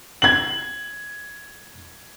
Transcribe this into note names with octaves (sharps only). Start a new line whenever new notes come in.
G#6 F#7